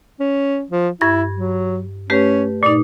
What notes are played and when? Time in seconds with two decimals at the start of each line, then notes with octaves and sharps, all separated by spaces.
0.20 C#4
0.71 F3
1.01 G2 E4 C#6 G#6
1.36 F#3
2.10 A3 C#4 G4 B4
2.63 A#2 D#4 D5